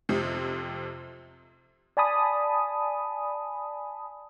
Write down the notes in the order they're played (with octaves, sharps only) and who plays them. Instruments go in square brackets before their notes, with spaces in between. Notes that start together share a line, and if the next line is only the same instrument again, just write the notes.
[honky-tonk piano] F2 C3 C4
[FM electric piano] D5 G#5 A5 B5 D#6